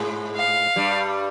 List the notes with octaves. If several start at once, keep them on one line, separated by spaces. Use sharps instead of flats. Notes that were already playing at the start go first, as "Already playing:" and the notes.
Already playing: G#2 G#3
F5
G2 G3